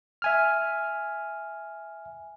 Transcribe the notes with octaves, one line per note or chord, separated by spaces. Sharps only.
E5 G#5 F6